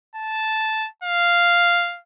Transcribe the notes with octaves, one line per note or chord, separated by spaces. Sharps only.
A5
F5